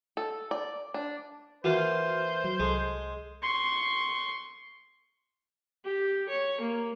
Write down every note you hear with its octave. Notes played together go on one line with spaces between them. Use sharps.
A4
D5
D4
E3 A#3 F4 F#4 C5 F6
F#3
C2 G#3 A4 C6
C6 C#6
G4
C#5
A#3